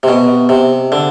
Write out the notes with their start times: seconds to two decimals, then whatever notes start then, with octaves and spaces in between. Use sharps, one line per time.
0.03 C3
0.08 B2
0.49 C3
0.92 D3